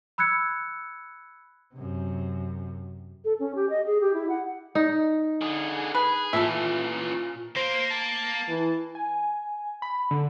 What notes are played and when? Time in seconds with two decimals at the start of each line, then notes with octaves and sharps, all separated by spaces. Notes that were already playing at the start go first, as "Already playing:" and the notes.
0.18 B5 E6 F#6 G#6 C#7
1.74 F#2 C3
3.25 A4
3.40 C#4
3.55 G4
3.70 D#5
3.86 G#4
4.01 G4
4.14 E4
4.29 F#5
4.75 D#4
5.41 D3 G#4
5.94 G#4 B4
6.33 A#2 E3 C#4 A4 E5
7.56 A#3 C5
7.91 A5
8.49 E3
8.95 G#5
9.82 B5
10.11 D3